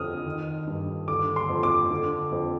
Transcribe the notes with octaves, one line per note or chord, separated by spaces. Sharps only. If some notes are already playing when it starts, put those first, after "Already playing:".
Already playing: F2 D3 D#6 F6
D#3
G2
D3 D6
C6
F2
D6
D3
F2